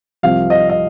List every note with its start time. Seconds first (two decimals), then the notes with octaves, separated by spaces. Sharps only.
0.23 C2 C3 F3 F5
0.50 D#5
0.69 D#5